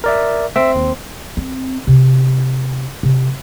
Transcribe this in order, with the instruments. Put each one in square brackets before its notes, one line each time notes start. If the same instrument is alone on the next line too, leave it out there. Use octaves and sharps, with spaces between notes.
[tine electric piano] A#4 D5 E5
[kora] C4 [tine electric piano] E5
[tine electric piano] D#2
[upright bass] C4
C3
C3